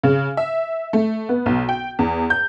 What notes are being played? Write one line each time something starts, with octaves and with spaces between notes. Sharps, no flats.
C#3
E5
A3
B3
B1
G5
E2
G6